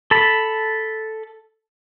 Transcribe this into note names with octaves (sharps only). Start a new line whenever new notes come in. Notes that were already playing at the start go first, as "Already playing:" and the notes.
A4 B5